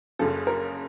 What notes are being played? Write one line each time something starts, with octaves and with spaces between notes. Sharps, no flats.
F#1 F#2 C#3 A4
A#4